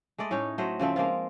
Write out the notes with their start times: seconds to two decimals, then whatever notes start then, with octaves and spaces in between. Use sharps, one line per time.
0.18 G#3 A3 D5 D#5
0.31 A2 C#4 D#4 C#5
0.58 F#3 A3 C5 D#5
0.80 C#3 F3 A3 C4
0.96 G#3 A#3 C4 F4